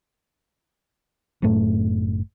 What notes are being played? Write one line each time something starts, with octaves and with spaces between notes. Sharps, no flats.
F#1 F#2 A2 A3